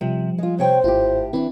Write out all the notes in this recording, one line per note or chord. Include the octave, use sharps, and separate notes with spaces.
C3 F3 G3
G#3 F4
C3 C5 C#5 G5
G#1 A2 E4 F4 G4
E3 C4 D4 E4